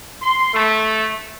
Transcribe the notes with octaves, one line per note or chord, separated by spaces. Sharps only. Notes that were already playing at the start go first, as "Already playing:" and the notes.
C6
A3